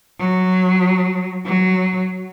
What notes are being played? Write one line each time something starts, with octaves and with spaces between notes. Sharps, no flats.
F#3
F#3